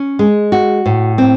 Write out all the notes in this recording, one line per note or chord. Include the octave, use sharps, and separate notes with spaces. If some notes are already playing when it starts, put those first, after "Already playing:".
Already playing: C#4
G#3
F#4
A2
C4